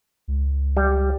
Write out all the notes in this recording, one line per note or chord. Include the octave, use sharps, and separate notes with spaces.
C#2
G3